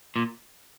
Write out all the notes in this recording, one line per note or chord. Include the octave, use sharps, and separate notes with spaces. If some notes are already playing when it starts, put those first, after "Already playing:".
A#2